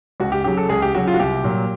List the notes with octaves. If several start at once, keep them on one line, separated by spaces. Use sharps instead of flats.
C#2 F#4
G4
C#3 F#3 G4
A4
C#2 G#4
G4
C#3 F#3 F#4
F4
F#4
C2 G4
A#2 F#3